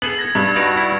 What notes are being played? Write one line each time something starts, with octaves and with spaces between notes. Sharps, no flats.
B3 G#4 A4 F#7
G#6 A#6
G2 B3
G3 D#4 F#4 B4 D5 A#5
E4